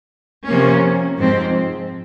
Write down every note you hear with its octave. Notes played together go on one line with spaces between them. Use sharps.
C3 F3 A#3 C#4
G#2 F3 C4